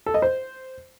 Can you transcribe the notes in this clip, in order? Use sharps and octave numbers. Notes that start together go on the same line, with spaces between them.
A4
D#5
C5